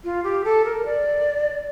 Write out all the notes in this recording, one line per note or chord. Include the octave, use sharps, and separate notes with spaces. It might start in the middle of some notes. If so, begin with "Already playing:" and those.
F4
G4
A4
A#4
D5